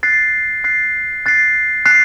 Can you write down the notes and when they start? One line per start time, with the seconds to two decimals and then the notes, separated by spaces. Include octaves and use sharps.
0.03 F#6 A6 C7
0.64 F#6 A6 C7
1.26 F#6 A6 C7
1.86 F#6 A6 C7